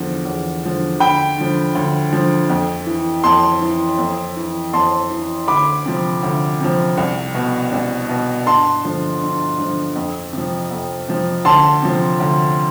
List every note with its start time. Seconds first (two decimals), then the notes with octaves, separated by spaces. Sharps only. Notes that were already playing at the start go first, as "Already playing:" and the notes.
Already playing: E2 D3 F3
0.25 E2
0.63 D3 F3
1.00 D2 G5 B5
1.37 D3 F3
1.75 D2
2.12 D3 F3
2.49 F2
2.86 E3
3.24 F2 A5 C6
3.61 E3
3.98 F2
4.36 E3
4.73 F2 A5 C6
5.11 E3
5.48 D2 B5 D6
5.86 C3 F3
6.23 D2
6.60 C3 F3
6.97 C2
7.35 B2
7.72 C2
8.09 B2
8.46 G2 A5 C6
8.84 D3 F3
9.21 G2
9.59 D3 F3
9.96 F2
10.33 C3 F3
10.71 F2
11.08 C3 F3
11.45 D2 A5 C6
11.82 C3 F3
12.20 D2